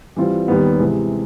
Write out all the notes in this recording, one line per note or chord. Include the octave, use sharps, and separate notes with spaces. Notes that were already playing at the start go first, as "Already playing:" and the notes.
E3 G3 C4 F4
D#2 D#3 G3 B3
C3 E3 G#3